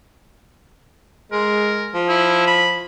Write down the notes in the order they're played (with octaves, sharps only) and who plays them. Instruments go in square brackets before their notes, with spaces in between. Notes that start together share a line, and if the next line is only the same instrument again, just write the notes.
[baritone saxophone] G#3 [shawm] A#4
[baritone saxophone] F3
[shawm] E4
B5